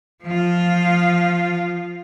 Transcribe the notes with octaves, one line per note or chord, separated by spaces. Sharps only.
F3 F4